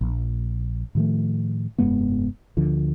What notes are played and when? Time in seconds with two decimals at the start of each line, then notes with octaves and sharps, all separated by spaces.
0.01 A#1
0.95 A2 D#3 F3 A3
1.78 F1 G2 G#3 B3
2.57 D2 D3 F3